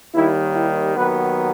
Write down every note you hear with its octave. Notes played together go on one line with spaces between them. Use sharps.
D#2 D#3 G3 E4
E4
D#2 D#3 F#3 B3 B4